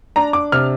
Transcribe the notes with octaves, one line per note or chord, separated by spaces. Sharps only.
D4 A#5
D6
C3 F6